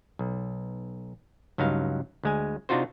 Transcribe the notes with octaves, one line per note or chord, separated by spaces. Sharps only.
B1
C#2 G2 F#3 D#4 F5
D2 G#3 G#5
C3 D4 D#4 F4 F#4 C5